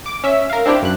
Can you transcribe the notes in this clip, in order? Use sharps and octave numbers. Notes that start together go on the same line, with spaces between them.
D6
C#4 E5
A#4 F5
C4 D4 E4 G4
F#2 F#6